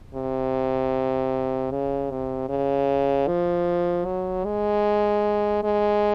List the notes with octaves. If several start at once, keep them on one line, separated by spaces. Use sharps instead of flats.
C3
C#3
C3
C#3
F3
F#3
G#3
G#3